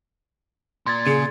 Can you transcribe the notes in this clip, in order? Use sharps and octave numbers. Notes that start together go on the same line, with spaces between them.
A#2 C6 G#6 A6
C#3 G#4